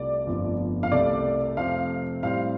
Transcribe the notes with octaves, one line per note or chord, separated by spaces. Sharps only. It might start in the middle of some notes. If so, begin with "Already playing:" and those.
Already playing: C2 C3 A3 F4 D5
G1 F2 F3 A3 D4
F5
C2 C3 A3 D5
F2 C3 A3 C4 F5
A2 G3 C4 F5